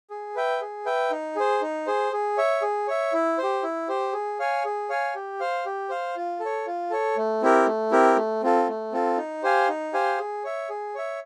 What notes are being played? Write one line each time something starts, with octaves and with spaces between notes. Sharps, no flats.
G#4
B4 E5 G5
G#4
B4 E5 G5
D#4
G#4 C5
D#4
G#4 C5
G#4
C#5 E5
G#4
C#5 E5
E4
G4 C5
E4
G4 C5
G#4
C#5 F5 G#5
G#4
C#5 F5 G#5
G4
C5 F5
G4
C5 F5
F4
A4
C#5
F4
A4 C#5
A3
C4 E4 G4 A#4
A3
C4 E4 G4 A#4
A3
C4 F4 A4
A3
C4 F4 A4
D#4
G4 C5 F5 G#5
D#4
G4 C5 F5 G#5
G#4
C#5 E5
G#4
C#5 E5